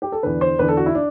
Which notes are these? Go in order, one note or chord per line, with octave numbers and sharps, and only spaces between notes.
G4
A4
E2 D3 B4
C5
E2 D3 B4
A4
F#4
E4
D4